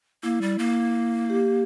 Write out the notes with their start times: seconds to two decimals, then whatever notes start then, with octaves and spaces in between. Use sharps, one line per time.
0.23 A#3 E4
0.42 G3
0.59 A#3
1.30 G4